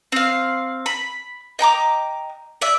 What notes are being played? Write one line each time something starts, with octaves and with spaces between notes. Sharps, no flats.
C4 F5
B5
D#5 G5 A#5 D6
D5 E5